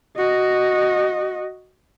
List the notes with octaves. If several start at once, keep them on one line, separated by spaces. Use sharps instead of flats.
F#4 D#5